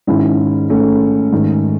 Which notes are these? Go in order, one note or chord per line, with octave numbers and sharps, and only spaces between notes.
G#2 D#3 C#4 E4
A3 C#4
G#2 D#3